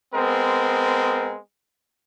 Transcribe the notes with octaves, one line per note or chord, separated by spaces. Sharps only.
G#3 B3 C4 A#4